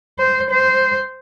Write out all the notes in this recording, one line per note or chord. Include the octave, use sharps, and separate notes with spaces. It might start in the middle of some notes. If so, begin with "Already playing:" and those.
C5
C5